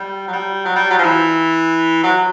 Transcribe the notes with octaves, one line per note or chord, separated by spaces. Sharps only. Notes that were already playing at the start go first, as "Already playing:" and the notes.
Already playing: G3
F#3
G3
F#3
G3
F#3
F3
E3
F#3